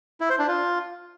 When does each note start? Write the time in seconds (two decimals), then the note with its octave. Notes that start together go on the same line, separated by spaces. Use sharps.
0.21 E4
0.30 C5
0.39 D4
0.48 F4